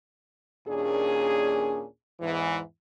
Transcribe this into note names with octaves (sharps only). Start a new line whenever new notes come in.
D#2 A#2 C#4 D4 G#4
E2 G#2 E3